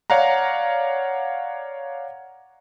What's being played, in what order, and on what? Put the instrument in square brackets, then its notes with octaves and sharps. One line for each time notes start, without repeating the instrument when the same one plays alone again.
[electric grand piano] C#5 D5 F5 F#5 A#5